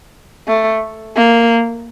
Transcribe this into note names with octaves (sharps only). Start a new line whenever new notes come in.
A3
A#3